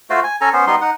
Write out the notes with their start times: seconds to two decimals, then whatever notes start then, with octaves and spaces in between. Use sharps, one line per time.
0.10 A3 F4 F#4 C5
0.24 G#5
0.41 C#4 A4 G#5 A#5
0.53 B3 C#4 C5
0.67 G3 B3 D#4 C6
0.81 D#4 F#5